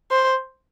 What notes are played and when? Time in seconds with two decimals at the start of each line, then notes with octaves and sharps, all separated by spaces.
0.11 C5